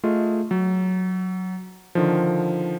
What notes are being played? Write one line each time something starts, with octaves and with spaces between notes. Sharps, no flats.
A3 F4 G#4 D#5
F#3
D3 D#3 F3